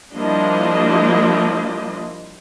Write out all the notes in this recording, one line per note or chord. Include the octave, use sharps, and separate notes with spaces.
F3 G3 A#3 D4 E4 D#5